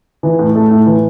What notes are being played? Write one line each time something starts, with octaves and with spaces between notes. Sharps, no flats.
E3
A2
A3
A2
E3